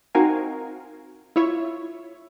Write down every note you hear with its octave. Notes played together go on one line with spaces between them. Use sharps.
C4 D#4 F#4 A#4 F5 G#5
E4 F4 C#5 E5